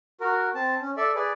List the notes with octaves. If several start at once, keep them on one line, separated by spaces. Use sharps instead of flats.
F#4 A#4
C4 A5
C#4
A4 D5 E5
G#4 B4 D5